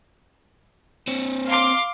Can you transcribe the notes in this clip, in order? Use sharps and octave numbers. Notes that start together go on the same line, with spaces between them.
C4 C5 C#5
F5 C6 D6